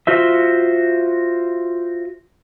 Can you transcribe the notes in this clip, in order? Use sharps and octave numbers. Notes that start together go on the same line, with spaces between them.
F4 F#4 C5 E5